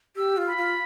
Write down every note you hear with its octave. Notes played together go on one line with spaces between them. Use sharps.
G4 E6
F4
B5
F4